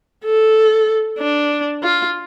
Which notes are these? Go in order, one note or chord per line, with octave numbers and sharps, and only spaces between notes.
A4
D4
F4